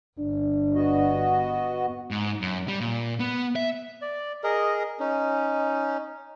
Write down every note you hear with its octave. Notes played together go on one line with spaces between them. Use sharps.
G1 D4
B3 F#4 D#5
G#2
F#2
G3
A#2
B3
E5
D5
G#4 A#4 D#5
C#4 D#4